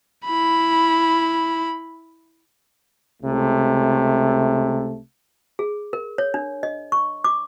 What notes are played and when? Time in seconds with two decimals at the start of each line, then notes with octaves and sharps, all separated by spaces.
0.25 E4 B5
3.23 C#2 C3 A3
5.59 G#4
5.93 A#4
6.18 C#5
6.34 D4
6.63 D#5
6.92 C#6
7.24 D6